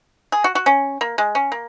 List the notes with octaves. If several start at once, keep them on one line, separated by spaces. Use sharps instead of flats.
G#4
F#4
F#4
C#4
A#3
G#3
C#4
A#3